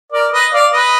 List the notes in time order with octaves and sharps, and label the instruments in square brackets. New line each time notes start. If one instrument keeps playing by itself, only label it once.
[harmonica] A#4 D5
B4 D#5
D5 F5
B4 D#5